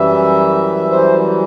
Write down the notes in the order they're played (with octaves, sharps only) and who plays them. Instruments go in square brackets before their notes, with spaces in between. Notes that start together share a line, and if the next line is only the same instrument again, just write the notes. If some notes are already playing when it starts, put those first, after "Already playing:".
Already playing: [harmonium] F#2 E3 G3 E5
C5